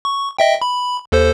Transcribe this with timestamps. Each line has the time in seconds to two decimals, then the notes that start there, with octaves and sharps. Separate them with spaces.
0.05 C#6
0.39 D#5 E5 G5
0.62 B5
1.12 D#2 A4 C5